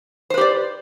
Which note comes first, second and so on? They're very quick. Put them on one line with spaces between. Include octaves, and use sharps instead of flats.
C5 B4 G4 D5